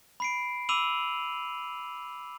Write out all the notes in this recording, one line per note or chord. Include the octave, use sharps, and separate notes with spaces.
B5 C7 D7
B5 D6 E6 D#7 F7 F#7